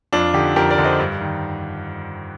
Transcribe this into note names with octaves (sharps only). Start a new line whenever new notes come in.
F2 D4 F4
D3 D#4 G4
F2 G4 A#4
A#4 D5
D3
C5 D#5
G2
D#3